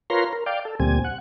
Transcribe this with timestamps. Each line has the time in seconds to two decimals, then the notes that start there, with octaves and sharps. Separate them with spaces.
0.10 F4 A#4 B4 C#5 A#5 C6
0.33 A#4
0.46 D5 F5 G5
0.65 A4
0.80 D2 A#2 G3 C4 G#5
1.04 F#5